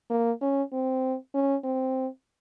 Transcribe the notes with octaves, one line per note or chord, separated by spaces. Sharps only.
A#3
C#4
C4
C#4
C4